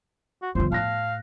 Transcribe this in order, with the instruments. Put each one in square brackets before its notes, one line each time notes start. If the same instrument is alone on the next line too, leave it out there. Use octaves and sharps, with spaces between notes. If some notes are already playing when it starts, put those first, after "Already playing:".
[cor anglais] F#4
[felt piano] G1 F3 [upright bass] F2 D3 [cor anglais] C5
[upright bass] A2 [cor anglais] F5 [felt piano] A5 F#6 A#6